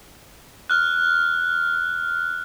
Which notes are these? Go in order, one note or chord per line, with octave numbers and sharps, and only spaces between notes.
F6 F#6